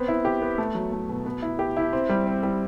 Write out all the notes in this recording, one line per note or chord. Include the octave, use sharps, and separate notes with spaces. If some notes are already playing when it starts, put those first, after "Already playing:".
Already playing: B3 C4
E4
G4
B3
A3
F#3
A3
B2
B3
E4
G4
E4
C4
G3
C4
G3